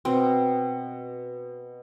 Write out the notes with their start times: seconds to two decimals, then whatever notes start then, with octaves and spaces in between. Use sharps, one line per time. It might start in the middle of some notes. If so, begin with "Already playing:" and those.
0.05 B2 C4